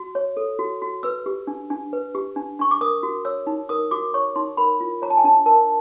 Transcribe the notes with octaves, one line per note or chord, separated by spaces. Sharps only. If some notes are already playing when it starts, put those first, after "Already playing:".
Already playing: F#4
C#5
A4
F#4
F#4
B4 E6
G4
D4
D4
B4
G4
D4
D4 C#6
D6
A#4 D#6
F#4
C#5 E6
D#4
A#4 D#6
F#4 D6
C#5 C#6
D#4 C6
A#4 B5
F4
C#5 A#5
A5
G#5
D4 A5
A#4 A5